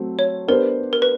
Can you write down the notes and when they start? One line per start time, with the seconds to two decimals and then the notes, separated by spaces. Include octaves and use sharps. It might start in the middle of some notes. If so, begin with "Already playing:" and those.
Already playing: F#3 A3 C4
0.19 C#5
0.48 B3 D4 G4 A#4 C5
0.93 A#4
1.02 B4